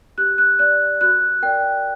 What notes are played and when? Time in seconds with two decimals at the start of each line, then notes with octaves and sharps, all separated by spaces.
0.18 G4 F#6
0.38 F#6
0.59 D5 F#6
1.01 F#4 F#6
1.42 A#4 D5 G5